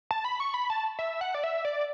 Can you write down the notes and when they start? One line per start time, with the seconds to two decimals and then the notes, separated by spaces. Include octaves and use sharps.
0.11 A5
0.25 B5
0.40 C#6
0.54 B5
0.70 A5
0.99 E5
1.21 F#5
1.34 D5
1.44 E5
1.65 D5